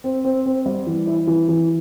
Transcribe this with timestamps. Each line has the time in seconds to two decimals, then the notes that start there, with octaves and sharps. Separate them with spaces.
0.04 C4
0.25 C4
0.46 C4
0.66 G3
0.87 E3
1.07 E4
1.27 E3
1.49 E3